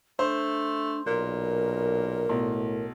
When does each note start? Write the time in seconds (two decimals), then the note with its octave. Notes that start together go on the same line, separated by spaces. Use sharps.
0.19 A3 D4 C5
1.06 B1 A#2 A#4
2.29 B1 A2